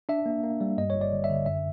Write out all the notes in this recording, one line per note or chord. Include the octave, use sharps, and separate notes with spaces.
D4 E5
A#3
A#3
G3
G2 D#5
C#5
G1
D5
G1
E5
D3
F#2 E5